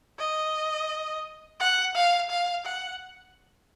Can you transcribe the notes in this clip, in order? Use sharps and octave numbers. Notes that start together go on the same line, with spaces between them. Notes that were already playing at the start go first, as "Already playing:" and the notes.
D#5
F#5
F5
F5
F#5